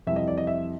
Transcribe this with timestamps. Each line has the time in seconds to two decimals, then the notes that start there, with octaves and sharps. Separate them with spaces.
0.07 F2 C3 E3 G3 E5
0.16 D#5
0.28 D5
0.38 D#5
0.47 E5